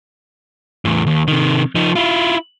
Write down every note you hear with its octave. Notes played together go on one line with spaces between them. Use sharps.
E2 A2
D#2
C3 D#3
F3 D#4
E4 F4